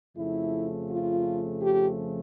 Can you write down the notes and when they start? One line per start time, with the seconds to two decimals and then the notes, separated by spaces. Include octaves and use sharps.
0.17 F2 C#3 F3 A3 E4
0.90 F4
1.62 G4